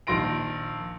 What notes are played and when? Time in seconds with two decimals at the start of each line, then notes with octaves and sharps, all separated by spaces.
0.07 A#1 D#3 C6 A#6 D7